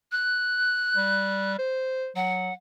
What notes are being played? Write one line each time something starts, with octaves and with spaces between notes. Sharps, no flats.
F#6
G3
C5
F#3 F#5